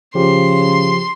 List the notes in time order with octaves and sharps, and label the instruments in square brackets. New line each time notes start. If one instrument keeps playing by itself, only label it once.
[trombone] C#3 [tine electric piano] F3 G4 [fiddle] C6